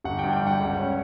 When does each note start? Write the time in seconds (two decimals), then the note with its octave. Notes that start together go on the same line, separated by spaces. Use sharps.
0.04 G1 F#5
0.19 G2 G5
0.33 G5
0.42 G2
0.47 F#5
0.60 C#2
0.79 C#4